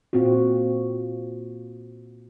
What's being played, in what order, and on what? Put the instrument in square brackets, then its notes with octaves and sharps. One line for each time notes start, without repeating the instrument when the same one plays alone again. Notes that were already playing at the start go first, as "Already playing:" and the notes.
[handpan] A#2 C4 F4 F#4